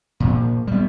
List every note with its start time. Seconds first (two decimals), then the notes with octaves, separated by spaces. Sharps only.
0.20 A#2 F3
0.67 G3 B3